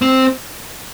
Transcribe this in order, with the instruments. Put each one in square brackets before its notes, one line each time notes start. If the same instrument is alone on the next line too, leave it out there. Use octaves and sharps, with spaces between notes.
[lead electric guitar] C4